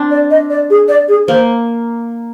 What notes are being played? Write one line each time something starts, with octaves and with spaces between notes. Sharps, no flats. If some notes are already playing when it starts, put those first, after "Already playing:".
Already playing: C4 D4
D5
D#5
D5
G#4
D5
G#4
A#3 C5